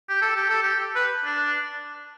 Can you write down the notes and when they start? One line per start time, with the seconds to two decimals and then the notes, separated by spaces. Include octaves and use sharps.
0.09 G4
0.22 A4
0.36 G4
0.50 A4
0.63 G4
0.95 B4
1.25 D4